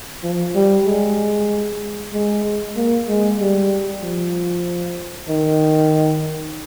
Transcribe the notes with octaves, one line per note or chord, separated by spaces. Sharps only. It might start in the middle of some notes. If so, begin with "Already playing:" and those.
F3
G3
G#3
G#3
A#3
G#3
G3
F3
D#3